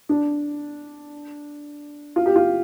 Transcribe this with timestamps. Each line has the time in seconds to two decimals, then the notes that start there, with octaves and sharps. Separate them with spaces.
0.09 D4
2.16 F4
2.26 G4
2.36 F4